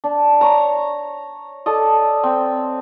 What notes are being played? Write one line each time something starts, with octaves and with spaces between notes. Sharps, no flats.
D4
C#5 A#5
A4 D5 D#5
C4